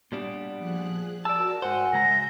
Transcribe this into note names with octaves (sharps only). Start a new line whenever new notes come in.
A#2 G3 B3 D4
F3 G#4 F#6
F#4 A#4 D5 A5 E6
G#2 C5 F#5 G#5
C#3 G#3 E5 A#5 G6 A#6